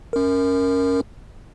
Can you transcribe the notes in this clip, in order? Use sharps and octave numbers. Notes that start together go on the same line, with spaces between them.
C#4 A#4